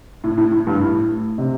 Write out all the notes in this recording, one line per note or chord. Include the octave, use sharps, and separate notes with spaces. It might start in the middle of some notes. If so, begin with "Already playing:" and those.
A2
A2
A2
G2
A2
C3